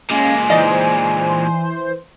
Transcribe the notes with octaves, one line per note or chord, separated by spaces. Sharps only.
A#2 G#3 C#4 F5 G#5
E3 D#4 C5 D5 D#5